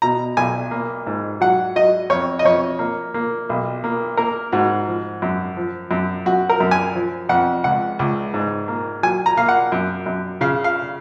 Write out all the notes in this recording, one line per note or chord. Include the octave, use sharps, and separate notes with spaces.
B2 A#5
B1 G#5
A#3
G#2
F#3 F#5
F#3 D#5
F2 C#5
D#5
F2 C#5
A#3
A#3
B1
A#3
A#3 A#4
G#2 F#4
F3
F#2
F3
F#2
F#2 F#4
A#4
F#2
G#5
F3
F2 F#5
C#2 F#5
C#2
G#2
A#3
F#3 G#5
A#5
A#3 F5
F#5
F#2
F#2
C#3 F5
F5